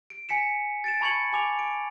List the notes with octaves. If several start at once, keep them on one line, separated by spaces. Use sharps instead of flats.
D7
G#5 B6 C#7 E7
A6 D7 E7
A5 B5 C#6 G#6 C#7 F#7
G#5 D6 F7
D7